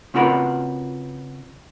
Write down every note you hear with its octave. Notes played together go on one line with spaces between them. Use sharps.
C#3 C4 F4 F#4 A#4 B4